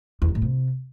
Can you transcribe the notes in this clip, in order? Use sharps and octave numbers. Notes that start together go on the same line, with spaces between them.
E2
D#3
A2
C3